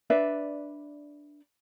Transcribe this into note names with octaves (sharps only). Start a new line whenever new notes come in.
D4 B4 D5 E5